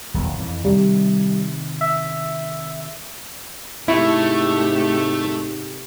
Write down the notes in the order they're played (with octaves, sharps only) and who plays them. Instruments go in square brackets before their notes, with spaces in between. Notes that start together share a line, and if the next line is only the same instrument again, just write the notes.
[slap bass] D#1 B1 A2
F2 E3
[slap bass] C3 D#3 [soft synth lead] G3
[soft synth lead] E5
[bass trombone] G#2 [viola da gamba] C3 G4 A4 [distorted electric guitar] A3 [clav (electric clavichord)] E4